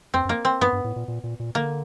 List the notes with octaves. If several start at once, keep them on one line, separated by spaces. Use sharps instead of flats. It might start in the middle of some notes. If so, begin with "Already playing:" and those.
F2 C4
F#2
A#3
C4
G2 B3
G2
A2
A#2
A#2
A#2
A#2
D3 A#3